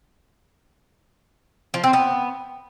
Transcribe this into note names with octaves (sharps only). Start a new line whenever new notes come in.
F3
C4
B3